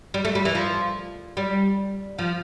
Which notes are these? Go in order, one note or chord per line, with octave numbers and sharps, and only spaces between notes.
G3
A3
G3
E3
F3
G3
F3